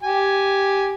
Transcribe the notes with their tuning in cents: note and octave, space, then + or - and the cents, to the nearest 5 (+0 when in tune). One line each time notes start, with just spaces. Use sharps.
G4 +0 G#5 +0